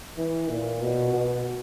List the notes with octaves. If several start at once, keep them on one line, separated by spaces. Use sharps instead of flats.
E3
A#2
B2
B2